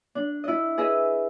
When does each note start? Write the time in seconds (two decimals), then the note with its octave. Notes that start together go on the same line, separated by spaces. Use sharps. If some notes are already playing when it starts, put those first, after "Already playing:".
0.15 D4
0.44 E4 D#5
0.78 G#4 B4 D#5 E5